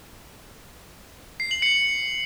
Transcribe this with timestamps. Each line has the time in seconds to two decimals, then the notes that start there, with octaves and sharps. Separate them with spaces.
1.40 C7
1.51 F#7
1.62 C#7